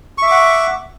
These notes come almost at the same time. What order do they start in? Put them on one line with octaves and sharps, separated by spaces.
C#6 E5 D6 F#5